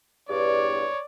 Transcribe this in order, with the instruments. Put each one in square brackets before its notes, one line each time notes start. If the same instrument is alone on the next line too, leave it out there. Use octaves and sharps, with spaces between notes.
[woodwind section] E2 G2 [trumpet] C#5 [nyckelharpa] D5